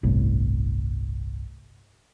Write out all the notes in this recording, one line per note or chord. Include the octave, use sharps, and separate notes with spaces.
G1 C2 A2